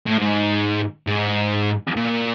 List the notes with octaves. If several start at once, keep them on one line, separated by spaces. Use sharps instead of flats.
A2
G#2
G#2
A#2